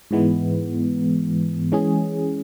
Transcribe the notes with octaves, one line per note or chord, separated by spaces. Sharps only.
G#2 E3 G#3 B3
E3 G#3 C#4 G#4